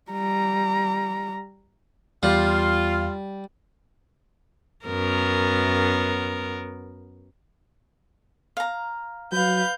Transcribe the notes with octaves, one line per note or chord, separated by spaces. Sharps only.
G3 A#5
E2 G3 F4
F#2 B3 A#4
F5 A#5
F#3 B4 F5 G6